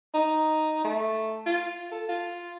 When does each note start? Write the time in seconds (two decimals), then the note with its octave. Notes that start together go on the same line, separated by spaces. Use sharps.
0.14 D#4
0.84 A3
1.46 F4
1.92 A4
2.09 F4